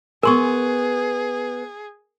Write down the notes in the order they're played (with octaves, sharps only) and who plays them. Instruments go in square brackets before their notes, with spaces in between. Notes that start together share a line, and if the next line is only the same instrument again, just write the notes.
[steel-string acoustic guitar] B3 G#5 [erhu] G#4 [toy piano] A#4 C6 C#6